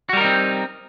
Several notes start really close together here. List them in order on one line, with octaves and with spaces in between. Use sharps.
F#4 G3 A#4 D#4 C4